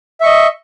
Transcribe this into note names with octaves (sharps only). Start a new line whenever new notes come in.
D#5 E5 C#6